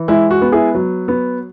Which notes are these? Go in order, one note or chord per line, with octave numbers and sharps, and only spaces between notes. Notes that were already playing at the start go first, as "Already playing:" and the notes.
Already playing: E3
G#3 E4
F#4
B3
E4 G#4
F#3
B3